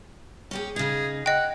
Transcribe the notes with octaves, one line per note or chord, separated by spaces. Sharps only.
C#4 G4 G#4
C#3 D#4 G#4
D#5 F#5 G5